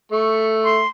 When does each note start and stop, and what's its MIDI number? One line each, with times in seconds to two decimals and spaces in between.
0.12 0.83 57
0.12 0.46 85
0.64 0.88 84